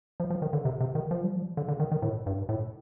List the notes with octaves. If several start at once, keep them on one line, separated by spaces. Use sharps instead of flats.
F3
F3
D#3
D3
C3
C3
D#3
F3
G3
F3
D3
D3
D#3
D#3
A2
G2
A2